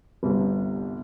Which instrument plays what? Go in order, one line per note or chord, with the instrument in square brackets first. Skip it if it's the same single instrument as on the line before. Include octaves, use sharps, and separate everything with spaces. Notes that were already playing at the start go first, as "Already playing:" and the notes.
[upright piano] G1 C2 C3